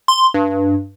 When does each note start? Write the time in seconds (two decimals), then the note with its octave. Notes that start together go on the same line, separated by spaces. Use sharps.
0.08 C6
0.34 G2